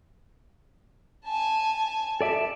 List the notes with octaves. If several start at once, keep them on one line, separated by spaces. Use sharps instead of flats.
G#5 A5
A4 D5 E5